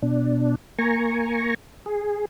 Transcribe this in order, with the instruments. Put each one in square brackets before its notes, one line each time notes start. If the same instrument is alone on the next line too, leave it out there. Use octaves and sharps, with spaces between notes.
[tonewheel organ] B2 D4
A#3 G#5 A#5 C#6
G#4